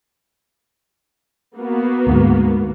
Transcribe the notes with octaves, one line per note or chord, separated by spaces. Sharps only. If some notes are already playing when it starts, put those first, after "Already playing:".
A#3 B3 F#4
D2 G#2